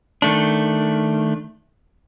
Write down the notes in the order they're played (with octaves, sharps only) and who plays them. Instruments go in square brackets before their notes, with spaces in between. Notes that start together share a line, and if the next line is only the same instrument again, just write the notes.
[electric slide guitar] D#3 A3 D4